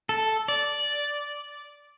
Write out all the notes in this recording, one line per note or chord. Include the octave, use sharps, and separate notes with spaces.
A4
D5